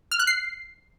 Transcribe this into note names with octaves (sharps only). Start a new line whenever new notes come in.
F6
F#6
C7